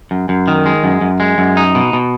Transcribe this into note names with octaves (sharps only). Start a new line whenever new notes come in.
F#2
F#2
D#3
G#3
F#2
F#2
G#3
F#2
D#4
B2
B2